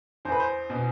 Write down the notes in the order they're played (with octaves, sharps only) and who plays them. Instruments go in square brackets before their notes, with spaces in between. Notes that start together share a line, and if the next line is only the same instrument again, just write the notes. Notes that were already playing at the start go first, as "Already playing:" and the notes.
[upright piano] E2 [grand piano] C5
[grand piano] B4
C5
[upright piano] B2